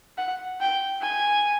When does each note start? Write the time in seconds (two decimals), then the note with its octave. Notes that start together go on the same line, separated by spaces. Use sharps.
0.18 F#5
0.60 G5
1.02 G#5